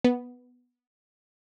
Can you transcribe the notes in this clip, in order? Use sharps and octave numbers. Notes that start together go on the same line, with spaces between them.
B3